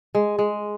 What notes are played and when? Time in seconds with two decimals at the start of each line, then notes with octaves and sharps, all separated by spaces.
0.15 G#3
0.39 G#3